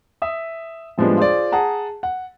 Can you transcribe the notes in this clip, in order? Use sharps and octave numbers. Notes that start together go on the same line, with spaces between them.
E5 D#6
A2 F3 G3 G#3 B3 D4
F4 G#4 C5 D5
G#4 F#5 A5 A#5
F#5